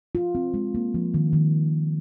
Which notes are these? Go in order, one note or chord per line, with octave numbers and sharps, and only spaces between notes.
F4
C4
G#3
A#3
F3
D#3
D#3